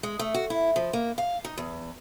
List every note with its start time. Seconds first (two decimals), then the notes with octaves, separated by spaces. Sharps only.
0.03 G#3
0.19 A3
0.34 F#4
0.50 E4
0.76 F3
0.93 A#3
1.18 F5
1.45 D#4
1.58 E2